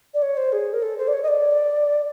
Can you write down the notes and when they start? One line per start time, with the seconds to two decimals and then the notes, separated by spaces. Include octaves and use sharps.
0.14 D5
0.22 C#5
0.37 C5
0.52 G#4
0.73 A#4
0.82 A4
0.98 C5
1.08 D5
1.13 C#5
1.23 D#5
1.28 D5